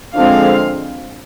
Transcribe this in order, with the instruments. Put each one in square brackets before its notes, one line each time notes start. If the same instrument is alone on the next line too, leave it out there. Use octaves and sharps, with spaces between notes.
[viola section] D3 F3 G#3 C4 F5